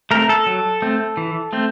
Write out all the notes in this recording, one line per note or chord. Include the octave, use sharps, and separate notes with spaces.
A3 C4 A#4
A4
F#3
A3 C4
E3
A3 C4